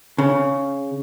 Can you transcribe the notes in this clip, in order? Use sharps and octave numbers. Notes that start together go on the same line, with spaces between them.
C#3